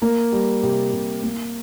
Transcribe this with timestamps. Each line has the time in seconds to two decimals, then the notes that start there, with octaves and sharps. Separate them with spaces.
0.02 A#3 A#4
0.32 G3
0.63 C3 G4
0.93 C3
1.23 A#3